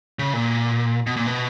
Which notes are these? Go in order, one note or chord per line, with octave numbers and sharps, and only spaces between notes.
C#3
A#2
B2
A#2
B2